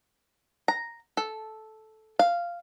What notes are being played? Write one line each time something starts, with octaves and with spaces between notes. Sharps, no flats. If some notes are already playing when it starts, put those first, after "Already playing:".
A#5
A4
F5